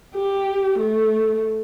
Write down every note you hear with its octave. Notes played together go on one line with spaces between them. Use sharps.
G4
A3